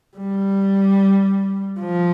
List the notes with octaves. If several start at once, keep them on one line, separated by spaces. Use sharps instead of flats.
G3
F3